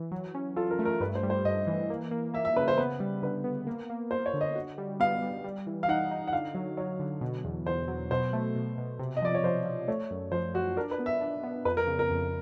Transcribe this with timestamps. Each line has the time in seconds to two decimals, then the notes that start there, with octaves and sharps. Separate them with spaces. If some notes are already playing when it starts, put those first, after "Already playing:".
Already playing: E3
0.12 F#3
0.34 C#4
0.56 F4 A4
0.71 A#4
0.79 A3
0.85 A#4
1.01 G2 B4
1.15 C5
1.23 G3
1.30 C5
1.45 G2 D#5
1.67 E3
1.90 A#3
2.11 A#3
2.33 A#3 E5
2.45 E5
2.56 C#3 B4
2.68 C5
2.78 B3 B4
3.00 G3
3.22 D3 B4
3.44 B3
3.67 A#3
3.90 A#3
4.11 A#3 C5
4.26 C#5
4.34 D3
4.41 D#5
4.56 F#4
4.78 G3
5.00 B3 F5
5.22 G3
5.44 G3
5.67 E3
5.83 F5
5.88 D#4 F#5
6.11 D#4
6.28 F#5
6.33 D3 F5
6.55 F#3
6.77 F#3 C#5
7.00 D3
7.21 B2
7.44 E2
7.66 E2 C5
7.88 F#3
8.11 B2 C5
8.33 A3
8.55 B2
8.78 B2
8.99 C3
9.17 D#5
9.22 F3 D5
9.35 C#5
9.44 F3 C5
9.65 F3
9.88 A3 C#5
10.11 F#2
10.32 F3 C5
10.54 F3 F#4
10.77 D4 A#4
10.91 B4
10.99 B3
11.06 E5
11.21 D4
11.43 B3
11.65 F2 B4
11.77 A#4
11.87 C#3
11.99 A#4
12.10 F2